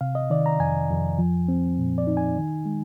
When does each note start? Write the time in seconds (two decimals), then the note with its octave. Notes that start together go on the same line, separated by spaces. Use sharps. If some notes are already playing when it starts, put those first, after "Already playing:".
0.01 C3 F5
0.15 D#5
0.30 D#3 D5
0.46 A#5
0.59 F2 G#5
0.90 F2
1.19 F3
1.48 C4
1.78 A#2
1.98 D5
2.07 D#4
2.17 G#5
2.37 D#3
2.66 G#3